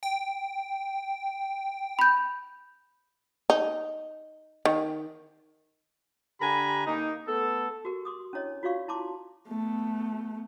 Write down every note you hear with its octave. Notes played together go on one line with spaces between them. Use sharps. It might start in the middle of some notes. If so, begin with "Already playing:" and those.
G5
B5 G6
D#4
D#3
D3 G4 G#5 A#5 B5
A#3 D#4
A3 B3 A4
F#4 G4 A#4
C6 D6 D#6
C#4 D4 E4 C#5 D#5
F4 F#4 C#5 D5 F5 C#6
E4 A5 C6 D6
A3 B3